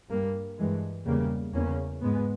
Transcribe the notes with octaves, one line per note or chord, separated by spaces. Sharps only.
G2 G3 A#3
G2 E3 G#3
E2 C#3 G3 A#3
E2 C#3 A#3 C#4
G#2 G#3 B3